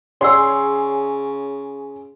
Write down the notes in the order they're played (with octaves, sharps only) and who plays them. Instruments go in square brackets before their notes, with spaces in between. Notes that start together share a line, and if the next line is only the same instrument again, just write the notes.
[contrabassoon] C#3 [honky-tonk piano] G#4 C#5 C6 [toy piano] D5 F#5 E6